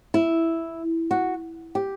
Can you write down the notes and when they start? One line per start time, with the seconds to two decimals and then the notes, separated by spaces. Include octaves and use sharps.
0.14 E4
1.11 F#4
1.75 G4